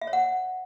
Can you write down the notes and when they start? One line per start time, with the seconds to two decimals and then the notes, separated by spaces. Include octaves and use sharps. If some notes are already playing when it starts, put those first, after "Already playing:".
0.01 E5
0.07 C#5
0.13 F#5